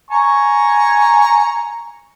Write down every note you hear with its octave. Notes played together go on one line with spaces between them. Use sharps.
G#5 A#5 C#6